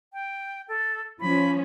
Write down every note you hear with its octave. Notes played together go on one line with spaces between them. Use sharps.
G5
A4
F3 C#4 B5